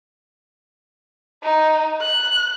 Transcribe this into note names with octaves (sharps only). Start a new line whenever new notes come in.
D#4
F#6